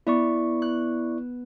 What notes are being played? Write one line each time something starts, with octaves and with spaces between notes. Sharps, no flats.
B3 E4 D5 C#6
F#6